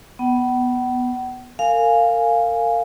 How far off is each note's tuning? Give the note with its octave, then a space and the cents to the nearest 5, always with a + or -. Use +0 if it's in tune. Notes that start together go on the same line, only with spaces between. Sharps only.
B3 -5 F#5 +40
A#4 -35 F5 +0 G#5 +0